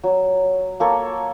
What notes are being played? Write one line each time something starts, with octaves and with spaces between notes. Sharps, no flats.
F#3
A#3 A4 C#5